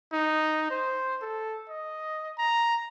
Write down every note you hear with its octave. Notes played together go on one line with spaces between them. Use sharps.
D#4
C5
A4
D#5
A#5